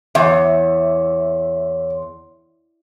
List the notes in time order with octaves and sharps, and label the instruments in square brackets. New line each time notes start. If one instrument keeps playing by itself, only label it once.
[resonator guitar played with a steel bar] E2 [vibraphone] C#5 C6 [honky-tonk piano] E5